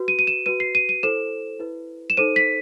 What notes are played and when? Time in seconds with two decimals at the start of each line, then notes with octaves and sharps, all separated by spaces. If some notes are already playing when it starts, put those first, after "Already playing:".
Already playing: F#4 B4
0.08 D#7
0.19 D#7
0.27 E7
0.46 F#4 B4 D#7
0.60 C7
0.75 D#7
0.89 D#7
1.03 E4 A4 C5 E7
1.60 E4 B4
2.10 E7
2.17 D#4 A4 C5 D#7
2.36 B6